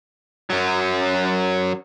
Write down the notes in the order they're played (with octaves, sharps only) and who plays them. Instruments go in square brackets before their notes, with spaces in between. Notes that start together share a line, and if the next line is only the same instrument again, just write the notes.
[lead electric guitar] F#2 F#3